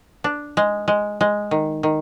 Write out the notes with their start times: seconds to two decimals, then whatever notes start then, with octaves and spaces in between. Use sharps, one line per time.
0.24 D4
0.57 G#3
0.88 G#3
1.21 G#3
1.51 D#3
1.83 D#3